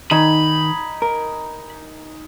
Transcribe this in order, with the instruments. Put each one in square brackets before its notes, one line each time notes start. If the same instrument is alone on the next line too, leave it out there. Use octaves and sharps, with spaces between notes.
[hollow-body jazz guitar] D#3 [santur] D#4 G#5 [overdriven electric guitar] B5
[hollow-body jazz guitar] A#4